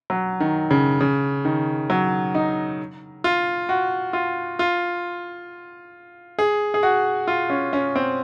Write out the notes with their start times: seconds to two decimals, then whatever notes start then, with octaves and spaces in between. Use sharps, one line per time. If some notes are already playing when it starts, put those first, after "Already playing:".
0.10 F#3
0.40 D#3
0.71 C#3
1.00 C#3
1.45 D#3
1.90 F#3
2.35 D#4
3.24 F4
3.69 F#4
4.13 F4
4.59 F4
6.39 G#4
6.74 G#4
6.83 F#4
7.28 F4
7.50 C#4
7.73 C#4
7.96 C4